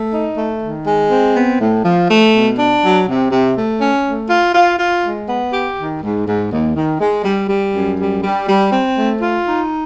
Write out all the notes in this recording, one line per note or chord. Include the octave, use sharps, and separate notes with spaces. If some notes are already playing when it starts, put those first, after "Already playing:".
Already playing: A3
D#4
A3
D#3
G#3
C4
B3
A2
F3
A3
B2
D4
F#3
C3
C3
A3
C#4
A3
F4
F4
F4
G#3
B3
G4
D#3
G#2
G#2
D#2
D#3
G#3
G3
G3
F#2
G3
G3
G3
C4
A3
F4
D#4